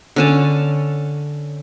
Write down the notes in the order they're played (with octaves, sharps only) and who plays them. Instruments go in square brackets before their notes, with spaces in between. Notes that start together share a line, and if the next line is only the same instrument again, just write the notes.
[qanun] D3 C#4 A5